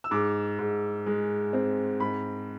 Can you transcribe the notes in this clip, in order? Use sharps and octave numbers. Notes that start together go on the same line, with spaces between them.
E6
G#2 D6
G#2
G#3
C4
G#2 B5